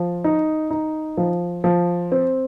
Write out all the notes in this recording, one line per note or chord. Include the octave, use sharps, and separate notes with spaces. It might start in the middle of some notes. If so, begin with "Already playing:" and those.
Already playing: F3
D#4
D#4
F3
F3
C4